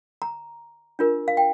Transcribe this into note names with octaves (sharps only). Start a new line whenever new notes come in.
A#5
D4 F4 A#4
F5
G5